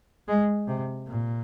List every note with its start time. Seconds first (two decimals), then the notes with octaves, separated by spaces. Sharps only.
0.28 G#3
0.68 C3
1.07 A#2